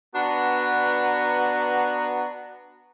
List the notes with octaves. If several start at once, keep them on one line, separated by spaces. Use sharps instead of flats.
B3 D4 F#4 B4 A#5